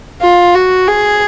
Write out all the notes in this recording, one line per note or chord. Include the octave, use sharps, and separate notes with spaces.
F4
F#4
G#4